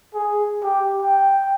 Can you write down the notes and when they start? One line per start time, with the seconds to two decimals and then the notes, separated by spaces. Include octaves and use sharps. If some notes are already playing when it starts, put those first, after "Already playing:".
0.14 G#4
0.63 G4
1.02 G5